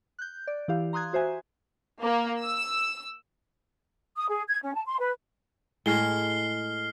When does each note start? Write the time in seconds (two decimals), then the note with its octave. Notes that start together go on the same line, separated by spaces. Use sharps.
0.19 F#6 G6
0.47 D5
0.68 E3 E4 G4 F5
0.93 A#5 C6 D#6 F#6 G#6
1.13 F#4 C5 E5 G#5
2.02 A#3
2.41 E6
4.17 D#6
4.29 G#4
4.48 G#6
4.63 C#4
4.75 A5
4.86 C6
4.99 B4
5.86 A2 G#3 F6 C7 G7